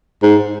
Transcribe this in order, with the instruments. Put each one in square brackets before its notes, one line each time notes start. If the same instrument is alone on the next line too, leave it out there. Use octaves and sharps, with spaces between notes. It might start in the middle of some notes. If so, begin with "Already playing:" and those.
[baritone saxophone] G#2